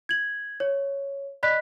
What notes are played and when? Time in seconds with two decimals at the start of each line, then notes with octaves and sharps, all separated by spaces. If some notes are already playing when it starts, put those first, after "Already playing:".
0.09 G#6 F#7
0.60 C#5
1.43 D5 D#5 B5 F#6 B6